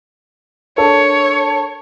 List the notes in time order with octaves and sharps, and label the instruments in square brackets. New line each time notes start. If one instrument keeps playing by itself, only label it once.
[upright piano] D4 A4 A#4 [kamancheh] C#5